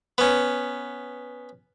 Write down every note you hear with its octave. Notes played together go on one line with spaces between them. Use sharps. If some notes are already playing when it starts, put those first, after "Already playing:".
B3 C#4